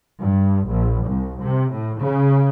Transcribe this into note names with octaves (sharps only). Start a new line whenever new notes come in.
G2
A#1
C2
C3
A2
C#3